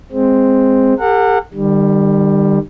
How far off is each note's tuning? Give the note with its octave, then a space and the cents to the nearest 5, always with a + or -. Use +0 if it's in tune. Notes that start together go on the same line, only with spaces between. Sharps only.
G#3 +0 C4 +0
G4 +35 A#4 -40 F#5 -20
D#3 -40 G3 +10